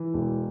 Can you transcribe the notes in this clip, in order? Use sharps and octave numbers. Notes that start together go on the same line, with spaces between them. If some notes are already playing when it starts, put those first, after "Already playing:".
Already playing: E3
E1